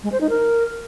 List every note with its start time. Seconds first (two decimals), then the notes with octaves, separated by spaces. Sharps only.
0.03 G#3
0.12 C5
0.21 D#4
0.29 A#4